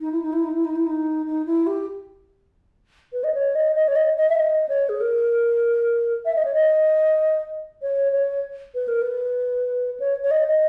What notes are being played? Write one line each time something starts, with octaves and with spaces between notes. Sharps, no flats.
D#4
E4
D#4
E4
D#4
E4
D#4
E4
D#4
D#4
E4
G4
B4
D#5
C#5
D#5
D#5
C#5
D#5
D#5
E5
D#5
C#5
G#4
A#4
E5
D#5
C#5
D#5
C#5
C#5
B4
A#4
B4
C#5
C#5
D#5
D#5